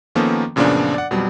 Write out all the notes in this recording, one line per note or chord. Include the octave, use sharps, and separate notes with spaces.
D#3 F3 A#3 B3 C#4 A4
F#2 A#2 C#3 F3 B3 D4
D5 F#5
F2 B2 F#3 G3